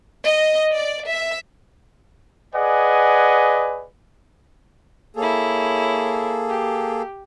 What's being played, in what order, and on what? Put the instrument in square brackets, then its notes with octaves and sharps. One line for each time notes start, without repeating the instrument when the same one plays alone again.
[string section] D#5
D5
E5
[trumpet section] G#4 B4 D5 D#5 F#5 G#5
[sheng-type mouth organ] A#3 G#4 A4 [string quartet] E4 C#5
[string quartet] G4